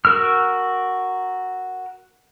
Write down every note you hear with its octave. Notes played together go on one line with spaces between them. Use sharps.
F#4 A#4 E6 F6